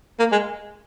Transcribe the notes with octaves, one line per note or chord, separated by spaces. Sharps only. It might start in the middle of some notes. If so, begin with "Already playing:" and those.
A#3
G#3